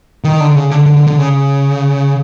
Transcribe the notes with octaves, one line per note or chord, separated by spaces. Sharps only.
D#3
D3
C#3
D3
D3
D3
D3
C#3